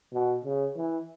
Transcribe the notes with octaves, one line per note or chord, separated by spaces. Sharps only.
B2
C#3
E3